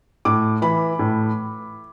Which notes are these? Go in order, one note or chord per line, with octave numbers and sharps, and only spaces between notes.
A2 D6
E3 B5
A2